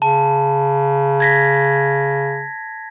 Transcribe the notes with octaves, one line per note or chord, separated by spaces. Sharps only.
C#3 A5
G#6 A#6 B6